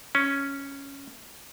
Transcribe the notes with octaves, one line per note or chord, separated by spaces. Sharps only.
C#4